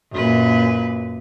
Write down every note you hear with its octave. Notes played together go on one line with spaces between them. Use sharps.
F#2 A#2 B4